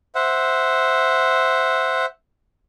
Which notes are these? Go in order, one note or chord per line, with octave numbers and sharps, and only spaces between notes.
C5 E5 F#5